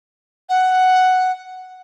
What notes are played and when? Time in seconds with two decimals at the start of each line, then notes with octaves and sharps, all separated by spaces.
0.49 F#5